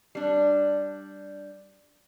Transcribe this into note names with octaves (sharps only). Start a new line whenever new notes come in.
G3 D4